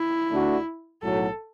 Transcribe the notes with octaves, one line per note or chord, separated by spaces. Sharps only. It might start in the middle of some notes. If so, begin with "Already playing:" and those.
Already playing: E4
D2 D3 A3 D4 F#4
B1 A2 F#3 A4